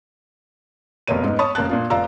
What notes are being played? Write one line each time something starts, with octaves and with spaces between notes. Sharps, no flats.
F1 B2 A#3 C#5 D#7
G#2 B3
C#5 A5 B5 C#6 D#6
F1 A#3 C#4 A5 F#6
A#2 D4 F4
F1 F4 D5 F5 A#5 E6